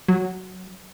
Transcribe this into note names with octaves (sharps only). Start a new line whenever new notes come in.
F#3